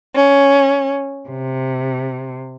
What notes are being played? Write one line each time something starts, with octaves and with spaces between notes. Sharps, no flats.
C#4
C3